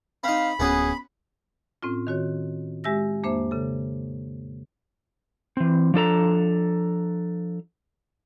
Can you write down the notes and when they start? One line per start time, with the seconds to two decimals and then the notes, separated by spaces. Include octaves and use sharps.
0.24 C4 D#4 F5 B5
0.60 D1 B3 C#4 F#4 G#4
1.83 A2 C4 C#4 F4
2.07 D#3 F#4 C#5
2.84 G#3 G4 E5 E6 A#6
3.23 F2 A#3 D4 C5 E5
3.51 C#3 A4
5.57 E3 C4
5.94 F3 D4 A4 A#5